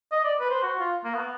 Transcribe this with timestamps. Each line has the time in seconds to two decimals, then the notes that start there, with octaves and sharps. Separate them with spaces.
0.12 D#5
0.24 D5
0.40 B4
0.50 C5
0.63 F#4
0.80 F4
1.04 A#3
1.15 B3